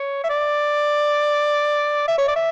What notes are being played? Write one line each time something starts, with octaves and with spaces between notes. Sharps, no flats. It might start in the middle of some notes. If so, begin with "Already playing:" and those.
Already playing: C#5
E5
D5
E5
C#5
D5
E5